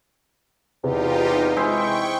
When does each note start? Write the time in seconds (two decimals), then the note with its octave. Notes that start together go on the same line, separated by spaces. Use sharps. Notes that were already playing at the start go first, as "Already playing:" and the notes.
0.84 E2 C3 D#4 F4 G4
1.57 G#3 E4 C5 G5 C#6